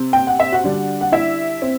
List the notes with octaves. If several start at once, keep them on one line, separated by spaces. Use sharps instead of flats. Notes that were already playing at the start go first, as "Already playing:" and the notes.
Already playing: C3 C4
G5
F#5
E5
F#4 F#5
D3 G3 D4
F#5
E4 E5
C4